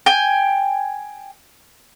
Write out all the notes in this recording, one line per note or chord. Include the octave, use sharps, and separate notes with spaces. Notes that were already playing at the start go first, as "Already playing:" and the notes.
G5 G#5